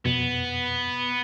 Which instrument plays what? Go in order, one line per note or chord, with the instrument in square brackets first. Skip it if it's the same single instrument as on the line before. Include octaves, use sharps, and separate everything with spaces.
[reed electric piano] F2 B2 [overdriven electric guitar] B3